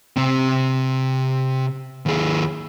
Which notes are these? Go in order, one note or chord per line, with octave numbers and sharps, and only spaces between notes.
C3 C4
D#2 G#4